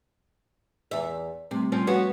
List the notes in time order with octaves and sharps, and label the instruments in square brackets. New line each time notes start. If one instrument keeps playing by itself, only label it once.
[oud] E2 E5
[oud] C3 [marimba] G3 A3 C4
[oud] F3 C4 C#4 [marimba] G3
[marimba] F3 [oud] B3 C#4 F#4